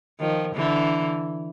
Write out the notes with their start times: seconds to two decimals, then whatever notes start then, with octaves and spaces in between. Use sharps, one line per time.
0.20 D#3 F3
0.55 D3 E3